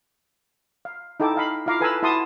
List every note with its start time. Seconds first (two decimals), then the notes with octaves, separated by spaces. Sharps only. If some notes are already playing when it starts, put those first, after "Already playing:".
0.85 F5
1.20 D#4 E4 A4 G5 D6
1.35 D#5 F5 B5
1.66 E4 F4 F5 A#5 D6
1.81 A4 B4 G#5 A#5 B5 E6
2.03 E4 F#4 A5 C6 D#6